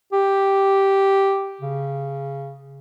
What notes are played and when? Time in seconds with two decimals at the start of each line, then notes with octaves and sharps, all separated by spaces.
0.13 G4
1.61 C#3